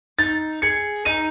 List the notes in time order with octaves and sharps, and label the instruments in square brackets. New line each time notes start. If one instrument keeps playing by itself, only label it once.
[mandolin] D#4 [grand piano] A6
[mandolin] G#4 [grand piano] C#7
[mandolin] D#4 [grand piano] D#7